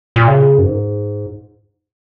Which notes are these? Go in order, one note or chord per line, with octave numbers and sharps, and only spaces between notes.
A#2
C#3
F#2
G#2